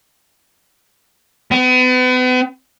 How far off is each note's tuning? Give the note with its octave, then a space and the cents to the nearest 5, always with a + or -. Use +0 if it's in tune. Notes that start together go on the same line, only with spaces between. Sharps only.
B3 +40